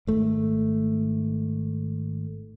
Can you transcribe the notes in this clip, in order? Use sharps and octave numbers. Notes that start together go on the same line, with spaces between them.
G#1 A3